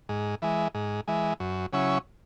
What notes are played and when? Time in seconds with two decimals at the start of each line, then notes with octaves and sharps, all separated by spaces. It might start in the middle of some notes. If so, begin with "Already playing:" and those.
0.09 G#2
0.42 E3 G#3
0.75 G#2
1.08 E3 G#3
1.40 F#2
1.73 C#3 F#3 C#4 E4